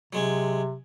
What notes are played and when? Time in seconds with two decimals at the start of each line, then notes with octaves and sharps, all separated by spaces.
0.13 C3 F#3 G#3 C#4